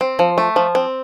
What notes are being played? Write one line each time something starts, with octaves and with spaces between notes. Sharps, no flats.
C4
F3
A3
F3
C4